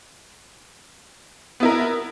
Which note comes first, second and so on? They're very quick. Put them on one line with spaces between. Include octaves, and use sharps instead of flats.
B3 E4 A#4